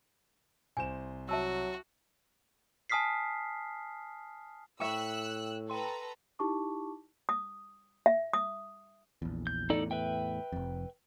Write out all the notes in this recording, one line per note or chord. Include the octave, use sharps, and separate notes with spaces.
C2 C5 G#5 E7
F#3 F#4 E5 A5 E6
G#5 A5 D#6 F6 B6 C7
A2 E5 G5 C#6 E6 F#6
A4 B4 G5 A#5 C6
D#4 E4 G4 A5 C#6 D6
D#6
E5
D#6
A#1 E2
G6
E2 A2 D#4 A4 D5
B4 E5 G5
F1 F2